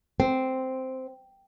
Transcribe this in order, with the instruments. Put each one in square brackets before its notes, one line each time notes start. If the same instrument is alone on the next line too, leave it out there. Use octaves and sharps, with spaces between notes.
[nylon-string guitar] C4